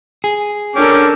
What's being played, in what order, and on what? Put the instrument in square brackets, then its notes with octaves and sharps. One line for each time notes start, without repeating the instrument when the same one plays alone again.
[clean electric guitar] G#4
[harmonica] C#4 G5 D6 [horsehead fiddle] D4 A4 [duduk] A#4